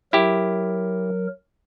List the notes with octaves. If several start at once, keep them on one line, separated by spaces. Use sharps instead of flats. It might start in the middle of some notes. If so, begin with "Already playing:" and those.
F#3 E4 G4 A#4